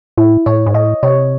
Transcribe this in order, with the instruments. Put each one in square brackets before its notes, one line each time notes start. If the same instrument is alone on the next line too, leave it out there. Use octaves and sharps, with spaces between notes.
[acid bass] A2 [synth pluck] E4
[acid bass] A2 [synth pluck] C#5
[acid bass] G#2
[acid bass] A2 [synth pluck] D#5
[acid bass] C3 [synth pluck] C#5